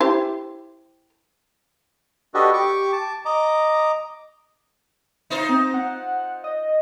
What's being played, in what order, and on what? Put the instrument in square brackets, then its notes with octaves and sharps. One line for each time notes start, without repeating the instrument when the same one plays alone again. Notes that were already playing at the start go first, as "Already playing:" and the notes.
[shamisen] E4 G4 C5
[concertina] D4 F#4 G4 A4 B4 D#5
G4 C#6 D6
A5 D6
D#5 A#5 D6
[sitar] D#4 F4 C5
[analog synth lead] C4
F#5
D#5